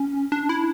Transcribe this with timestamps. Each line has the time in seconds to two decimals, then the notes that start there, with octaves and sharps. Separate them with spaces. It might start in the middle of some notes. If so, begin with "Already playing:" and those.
Already playing: C#4
0.32 D4
0.49 E4